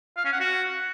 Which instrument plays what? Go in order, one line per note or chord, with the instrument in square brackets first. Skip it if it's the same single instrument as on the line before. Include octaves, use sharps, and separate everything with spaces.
[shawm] F5
C#4
F#5
F#4